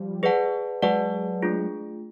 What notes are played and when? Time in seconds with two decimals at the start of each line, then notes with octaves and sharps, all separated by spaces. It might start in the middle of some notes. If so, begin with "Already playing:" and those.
Already playing: F3 G3
0.23 G#4 B4 D5 F#5 A5
0.82 F#3 G#3 G#4 B4 D5 F#5 A5
1.42 A3 D4 F4 G#4